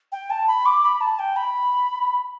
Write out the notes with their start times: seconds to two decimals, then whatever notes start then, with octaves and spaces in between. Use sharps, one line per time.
0.12 G5
0.30 A5
0.48 B5
0.66 D6
0.84 B5
1.01 A5
1.19 G5
1.36 B5